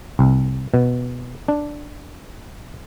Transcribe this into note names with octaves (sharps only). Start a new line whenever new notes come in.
C2
B2
D4